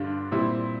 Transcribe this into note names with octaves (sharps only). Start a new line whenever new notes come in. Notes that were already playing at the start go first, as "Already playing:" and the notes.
Already playing: G2 D3 G3 D4 F4
A#2 G3 C4 E4